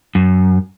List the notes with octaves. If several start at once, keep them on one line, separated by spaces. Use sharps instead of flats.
F#2